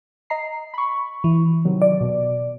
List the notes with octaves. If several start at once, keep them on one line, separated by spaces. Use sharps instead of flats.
D#5 A#5 C7
B5 C#6
E3
C3 D#3 F#3
D5
B2